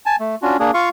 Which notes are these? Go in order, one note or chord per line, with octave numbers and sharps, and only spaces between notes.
G#5 A5
A3
C#4 D4 F4 F#4
A#3 D4 G#4
F4 F5 C#6